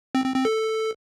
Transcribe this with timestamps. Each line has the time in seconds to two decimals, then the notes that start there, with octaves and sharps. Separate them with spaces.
0.15 C4
0.25 C4
0.35 C4
0.45 A4